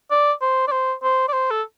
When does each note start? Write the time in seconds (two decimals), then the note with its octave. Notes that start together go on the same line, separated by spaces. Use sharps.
0.11 D5
0.41 C5
0.68 D5
0.71 C5
1.03 C5
1.28 D5
1.33 C5
1.51 A4